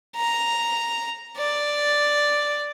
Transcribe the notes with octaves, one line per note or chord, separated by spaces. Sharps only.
A#5
D5